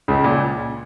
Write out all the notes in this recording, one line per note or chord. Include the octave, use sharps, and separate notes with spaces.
C#2 C#3
A#2